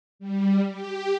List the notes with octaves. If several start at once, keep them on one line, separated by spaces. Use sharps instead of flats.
G3
G4